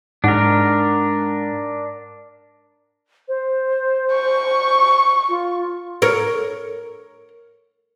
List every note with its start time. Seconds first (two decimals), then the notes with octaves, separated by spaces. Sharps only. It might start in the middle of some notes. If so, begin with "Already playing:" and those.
0.24 G#2 D4 A#4 F#5
3.28 C5
4.13 C#6
5.28 F4
6.02 A#4 C#5